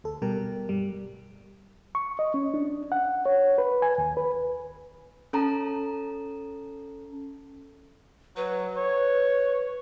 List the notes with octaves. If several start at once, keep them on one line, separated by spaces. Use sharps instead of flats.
D2 A4
B2 G3 G4 A#4
G2 G3
C#6
D#5
C#4
D4
F#5
C#5
B4
G#5
D#2
B4
C#4 A4 A5 A#5
F#3 B4
C#5